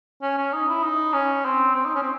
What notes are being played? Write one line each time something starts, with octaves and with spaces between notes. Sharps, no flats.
C#4
C#4
D#4
E4
D#4
C#4
C4
C4
D#4
C#4
C4